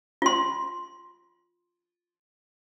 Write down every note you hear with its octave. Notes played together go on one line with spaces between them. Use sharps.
F4 C6